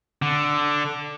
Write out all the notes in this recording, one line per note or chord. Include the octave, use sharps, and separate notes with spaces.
D3